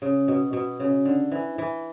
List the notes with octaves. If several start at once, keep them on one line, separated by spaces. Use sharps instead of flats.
C#3
B2
B2
C#3
D3
E3
E3